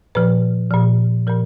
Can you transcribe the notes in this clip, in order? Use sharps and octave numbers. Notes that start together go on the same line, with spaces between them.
A#2 F3 B4
A#2 F3
A#2 F3 A#4